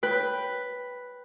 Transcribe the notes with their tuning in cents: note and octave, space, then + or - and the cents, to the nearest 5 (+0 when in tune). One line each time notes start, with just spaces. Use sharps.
B4 +0 G5 +0